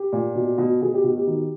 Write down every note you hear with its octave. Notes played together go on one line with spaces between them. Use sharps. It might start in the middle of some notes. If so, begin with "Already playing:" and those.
Already playing: G4
A#2
B2
B2
B2 G#4
G4
B2 F#4
G4
D#3